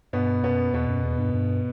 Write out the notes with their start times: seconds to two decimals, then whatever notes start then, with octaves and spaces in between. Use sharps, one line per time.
0.13 G2 B2 B3
0.43 F#2 B2 B3
0.73 E2 B2 B3
0.88 F#2
1.03 E2
1.18 G2
1.34 G2